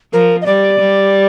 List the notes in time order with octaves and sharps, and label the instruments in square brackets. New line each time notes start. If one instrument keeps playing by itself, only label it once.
[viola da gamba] F3 [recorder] A#4
[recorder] D#5
[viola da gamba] G3 [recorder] D5
[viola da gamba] G3